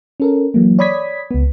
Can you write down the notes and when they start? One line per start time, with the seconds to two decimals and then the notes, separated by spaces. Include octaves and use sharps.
0.20 C#4 A4 A#4
0.54 E3 F#3 A#3
0.79 C#5 D5 B5 D#6 G#6 B6
1.31 C#2 B3